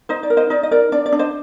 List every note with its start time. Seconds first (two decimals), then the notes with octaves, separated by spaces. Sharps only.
0.09 D#4 C5 D#5
0.23 D5
0.30 A#4
0.37 C5 D#5
0.50 D#4 D5
0.63 D#5
0.71 A#4 D5
0.92 D4 D5
1.06 D5
1.12 D4
1.19 C5 D#5